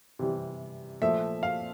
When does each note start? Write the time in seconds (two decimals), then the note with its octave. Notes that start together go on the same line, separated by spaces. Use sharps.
0.19 C3 E3 G3
1.02 A#2 F3 A3 E5
1.43 F5